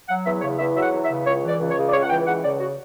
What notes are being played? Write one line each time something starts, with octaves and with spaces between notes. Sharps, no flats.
F#3 F#5
E2 E5
C#3 C#5
E2 E5
F#3 E5
F#5
E2
E5
C#3
C#2 C#5
E3
D5
C#2
C#5
C#3
D5
C#2 C#5
F#5
E3 G5
C#2 F#5
C#3 D5
F#4